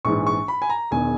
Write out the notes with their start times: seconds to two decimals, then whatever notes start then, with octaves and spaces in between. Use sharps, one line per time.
0.05 A#1 G#2 E3 C#6
0.27 C#6
0.48 B5
0.62 G#5
0.69 A#5
0.91 E1 E2 D#3 G#5